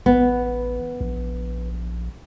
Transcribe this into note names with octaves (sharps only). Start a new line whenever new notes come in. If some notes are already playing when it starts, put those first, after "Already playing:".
A1 B3
A#1